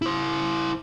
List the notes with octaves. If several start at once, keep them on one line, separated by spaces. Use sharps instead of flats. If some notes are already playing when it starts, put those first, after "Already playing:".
E4 C5